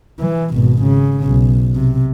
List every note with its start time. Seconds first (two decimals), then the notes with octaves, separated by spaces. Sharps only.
0.19 E3
0.53 G#1 B2
0.82 C#3
1.25 B1
1.75 C3